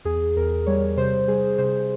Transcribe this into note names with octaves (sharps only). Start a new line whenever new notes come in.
E2 G#4
E2 A#4
G3 C#5
C3 C5
G3 G#4
C3 C5